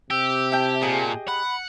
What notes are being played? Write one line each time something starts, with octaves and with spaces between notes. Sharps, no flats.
C3 G4 E6
E4 G5 A5
A#2 G4 G#4 D#5
F#5 B5